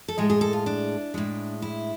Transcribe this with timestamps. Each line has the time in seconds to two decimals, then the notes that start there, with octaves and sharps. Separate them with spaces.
0.08 A4
0.18 A2 G#3 G#4
0.30 G#4
0.41 A4
0.53 F4
0.66 D4
1.14 A2 G#3
1.62 E4